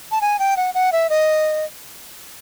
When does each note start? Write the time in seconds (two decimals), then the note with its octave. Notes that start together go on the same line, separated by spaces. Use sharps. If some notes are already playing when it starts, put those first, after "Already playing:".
0.12 A5
0.21 G#5
0.39 G5
0.57 F#5
0.74 F#5
0.92 E5
1.10 D#5